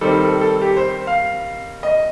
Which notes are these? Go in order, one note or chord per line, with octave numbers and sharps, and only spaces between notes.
D#3 G3 C4 A4
A4
A4
G4
C5
F5
D#5